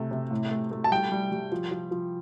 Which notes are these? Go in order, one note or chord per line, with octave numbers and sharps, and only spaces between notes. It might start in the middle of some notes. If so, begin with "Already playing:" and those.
Already playing: C3 A3
C3
A2
A3
A3
A5
G3 G5
G3
G3
F3
F3
F3